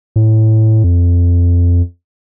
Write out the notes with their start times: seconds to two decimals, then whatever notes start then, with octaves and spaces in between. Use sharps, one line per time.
0.16 A2
0.84 F2